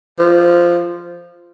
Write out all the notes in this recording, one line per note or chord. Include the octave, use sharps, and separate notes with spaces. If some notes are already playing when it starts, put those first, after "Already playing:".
F3